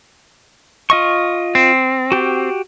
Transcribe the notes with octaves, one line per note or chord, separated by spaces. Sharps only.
F4 D#5 C#6
C4
F#4 G4